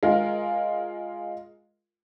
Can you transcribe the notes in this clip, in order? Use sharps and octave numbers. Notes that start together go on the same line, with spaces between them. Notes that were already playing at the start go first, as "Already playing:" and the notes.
G#3 F4 A#4